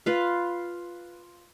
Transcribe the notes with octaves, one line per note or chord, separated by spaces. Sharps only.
F4 B4 F5